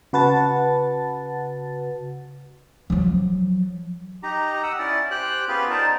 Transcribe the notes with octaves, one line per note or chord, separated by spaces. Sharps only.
C#3 F#4 B4 F#5 A5 A6
F3 F#3
D#4 G4 A#5
F#5 D#6 E6
C#4 E4 D5
G4 C5 G5 F#6
B3 C#4 F4 G4 G#4 B4
D#4 A#4 C5 D5 A5